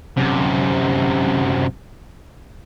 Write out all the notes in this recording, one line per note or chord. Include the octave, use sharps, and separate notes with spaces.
F#2 C3